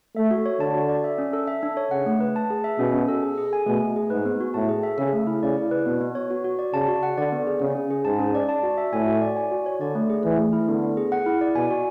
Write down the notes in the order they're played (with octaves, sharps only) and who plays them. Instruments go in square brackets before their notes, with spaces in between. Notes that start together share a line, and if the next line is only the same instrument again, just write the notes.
[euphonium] A3 [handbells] E5
[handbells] F#4
C#5
[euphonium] D3 [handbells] A5
[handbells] F#4
D5
E5
C#4
A4
E5
D4
C#5
[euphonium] C#3 [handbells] F#5
[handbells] A3
B4
A5
G#4
E5
[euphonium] B2 [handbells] C#4
[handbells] C#4
A4
G#4
G#4
G#5
[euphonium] B2 [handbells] A3
[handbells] A3
G#4
[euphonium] G#2 [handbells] B4
[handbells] B3
F#4
[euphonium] A2 [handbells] A5
[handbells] G#4
E5
[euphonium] C#3 [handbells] A4
[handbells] A3
E4
[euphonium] C#3 [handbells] D5
[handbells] E4
B4
[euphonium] B2 [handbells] B3
[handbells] B3
C#5
F#4
F#4
D5
[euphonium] C#3 [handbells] A5
[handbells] F#4
F#5
[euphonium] D3 [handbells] D5
[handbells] B3
G#4
[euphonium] C#3 [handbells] C#4
[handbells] C#4
G#4
[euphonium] G#2 [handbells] A5
[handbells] C#4
D5
A5
F#4
E5
[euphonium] A2 [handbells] G#5
[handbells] F#4
D5
G#5
F#4
C#5
[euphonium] D3 [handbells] D5
[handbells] A3
G#4
[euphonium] E3 [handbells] A3
[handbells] A3
E4
[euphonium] D3 [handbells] B3
[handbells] B3
G#4
F#5
E4
D5
[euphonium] B2 [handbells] G#5
[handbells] F#4